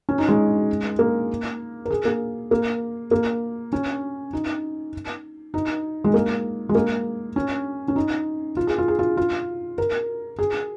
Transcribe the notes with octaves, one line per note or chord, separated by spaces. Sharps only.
C#4
D#4
G#3
A#3
A#4
G#4
A#3
A#3
A#3
C#4
D#4
D#4
G#3
A#3
G#3
A#3
C#4
C#4
D#4
F4
G#4
F4
G#4
F4
F4
A#4
G#4